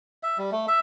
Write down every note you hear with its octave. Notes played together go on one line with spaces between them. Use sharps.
E5
G3
A3
E5